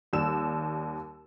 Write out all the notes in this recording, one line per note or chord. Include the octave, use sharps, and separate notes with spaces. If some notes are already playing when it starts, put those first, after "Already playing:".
D#2 G3 E6 E7